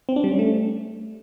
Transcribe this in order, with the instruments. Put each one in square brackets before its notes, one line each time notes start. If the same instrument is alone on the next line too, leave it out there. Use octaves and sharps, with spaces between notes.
[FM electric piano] C4
D4
G3
C#4
A3